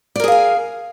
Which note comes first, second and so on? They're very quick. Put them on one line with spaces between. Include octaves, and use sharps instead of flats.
D5 A#4 G#4 F5 G#5